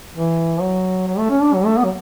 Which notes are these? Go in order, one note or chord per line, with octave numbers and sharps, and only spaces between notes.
E3
F#3
F#3
A3
C#4
D4
F#3
A3
B3
F#3